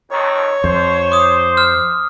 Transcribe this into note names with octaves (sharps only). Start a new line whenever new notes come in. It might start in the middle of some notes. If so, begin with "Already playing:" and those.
F2 D#3 C#5
F2 C5
D6 D#6
F6